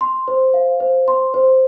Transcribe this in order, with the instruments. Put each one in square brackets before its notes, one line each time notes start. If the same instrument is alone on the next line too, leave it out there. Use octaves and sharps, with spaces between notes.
[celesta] C6
C5
F5
C5
C6
C5